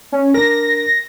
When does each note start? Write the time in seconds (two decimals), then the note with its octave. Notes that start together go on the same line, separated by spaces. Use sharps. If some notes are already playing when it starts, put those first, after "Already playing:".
0.12 C#4
0.34 D4 A#4 A#6